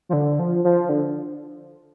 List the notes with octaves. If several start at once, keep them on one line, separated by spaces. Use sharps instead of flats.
F3
D3
F3
F3
D3